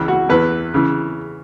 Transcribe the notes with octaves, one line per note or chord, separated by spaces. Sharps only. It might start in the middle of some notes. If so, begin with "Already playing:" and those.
Already playing: C#2 C#3 E3
F#4
E2 E3 B4
C#3 E3